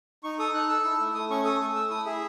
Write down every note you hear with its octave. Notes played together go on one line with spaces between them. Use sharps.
D#4 C#6
A4 D#6
D#4 F#6
A4 E6
E4
A3
A3 D#6
C#4 C#6
A4 D#6
A3
A3 E6
E4 D#6
G#4 E5